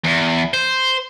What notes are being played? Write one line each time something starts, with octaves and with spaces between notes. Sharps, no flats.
E2
C5